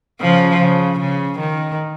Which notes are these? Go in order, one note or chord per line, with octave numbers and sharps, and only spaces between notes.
C#3 F3
C#3
C#3
D#3